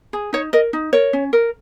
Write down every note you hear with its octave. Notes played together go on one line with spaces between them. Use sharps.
G#4
D#4 C#5
A#4 D#5
D#4
A#4 C#5
C#4
A#4